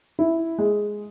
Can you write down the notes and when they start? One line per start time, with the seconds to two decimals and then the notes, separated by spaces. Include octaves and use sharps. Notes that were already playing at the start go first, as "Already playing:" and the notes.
0.19 E4
0.58 G#3